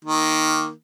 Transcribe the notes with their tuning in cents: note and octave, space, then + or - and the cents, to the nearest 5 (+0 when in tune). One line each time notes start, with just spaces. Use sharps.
D#3 +0 A#3 +0